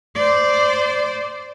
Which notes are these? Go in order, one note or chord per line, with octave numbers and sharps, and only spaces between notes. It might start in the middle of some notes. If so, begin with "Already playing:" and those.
C5 D5